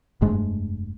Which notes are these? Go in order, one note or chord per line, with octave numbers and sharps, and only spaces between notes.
F1 G2 G#3 A3